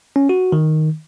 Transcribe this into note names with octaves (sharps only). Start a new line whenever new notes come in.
C#4
F#4
D#3